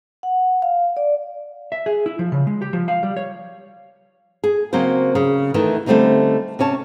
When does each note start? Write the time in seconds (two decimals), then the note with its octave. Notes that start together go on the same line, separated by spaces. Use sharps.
0.23 F#5
0.62 F5
0.97 D5
1.72 E5
1.86 G#4
2.06 E4
2.19 F3
2.32 C#3
2.47 G#3
2.62 G4
2.73 F3
2.88 F5
3.03 G3
3.17 C#5
4.44 G#4
4.73 C#3 F#3 A#3 C4 C5
5.15 C#3
5.54 D#3 E3 A3 B3
5.86 D3 G3 A3 C4 C#4 D#4
6.59 C3 C#4 C#5 A5